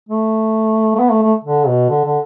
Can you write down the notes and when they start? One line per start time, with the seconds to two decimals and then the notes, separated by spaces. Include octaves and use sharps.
0.09 A3
0.95 A3
0.99 B3
1.11 A3
1.22 A3
1.44 D3
1.67 B2
1.90 D3
2.05 D3